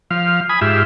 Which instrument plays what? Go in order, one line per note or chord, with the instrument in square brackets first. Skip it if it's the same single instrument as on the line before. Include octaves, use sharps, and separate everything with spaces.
[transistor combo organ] F3 F5
G#5 B5 D#6
G#2 F4 G4 E5